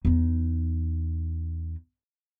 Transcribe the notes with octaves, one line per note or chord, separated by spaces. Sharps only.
E2 D#4